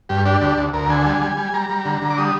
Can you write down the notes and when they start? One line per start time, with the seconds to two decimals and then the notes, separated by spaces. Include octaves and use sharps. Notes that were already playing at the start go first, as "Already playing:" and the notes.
0.09 G2 G4
0.26 D4 G4
0.41 D2 G4
0.57 D2
0.73 D2 A#4
0.90 D3 G#5
1.06 G3
1.22 G3
1.37 G3
1.53 G3 A#5
1.70 G3
1.85 D3
2.02 D3
2.10 D6
2.18 G3 D#6